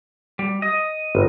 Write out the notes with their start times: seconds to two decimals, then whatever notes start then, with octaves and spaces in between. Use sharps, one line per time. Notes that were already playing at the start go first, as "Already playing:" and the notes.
0.39 G3
0.62 D#5
1.15 G1